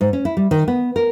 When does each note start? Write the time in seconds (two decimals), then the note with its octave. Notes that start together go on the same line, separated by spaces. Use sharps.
0.01 G#2
0.13 C#4
0.25 E4
0.37 G3
0.51 D#3
0.68 B3
0.96 A#4